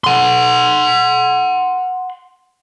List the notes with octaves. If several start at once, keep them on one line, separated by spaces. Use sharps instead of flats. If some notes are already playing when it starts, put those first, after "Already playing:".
F#5 C6